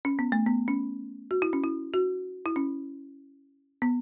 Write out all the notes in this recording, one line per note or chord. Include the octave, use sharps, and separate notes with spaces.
C#4
B3
A3
B3
C#4
F#4
E4
C#4
E4
F#4
E4
C#4
B3